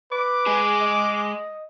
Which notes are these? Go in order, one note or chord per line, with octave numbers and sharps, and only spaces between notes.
B4 D6
G#3 G#4
D#5